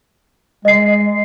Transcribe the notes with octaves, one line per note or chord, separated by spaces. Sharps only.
G#3 D#5 C7